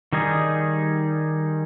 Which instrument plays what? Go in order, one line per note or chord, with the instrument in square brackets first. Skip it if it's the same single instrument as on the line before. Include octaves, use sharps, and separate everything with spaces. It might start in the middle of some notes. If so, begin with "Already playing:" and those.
[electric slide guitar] D#3 G3 D#4 G#4